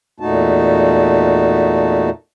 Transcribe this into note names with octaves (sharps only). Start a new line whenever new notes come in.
E2 A#2 A3 D#4 F#4 A5